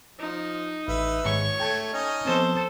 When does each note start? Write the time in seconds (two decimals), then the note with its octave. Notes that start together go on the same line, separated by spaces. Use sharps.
0.19 F3 D#4
0.88 A1 B4 E5
1.25 G#2 D#3 G#3 C#5 C#6
1.60 A3 G5 A5 G#6
1.93 C#4 D#4 D#5
2.25 F3 B3 C4 A4 C5